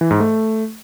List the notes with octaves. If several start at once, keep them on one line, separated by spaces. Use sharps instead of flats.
E3
G#2
A3